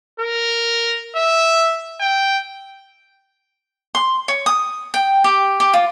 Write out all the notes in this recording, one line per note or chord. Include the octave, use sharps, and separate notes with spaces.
A#4
E5
G5
C6
C#5
D#6
G5
G4
G4
F4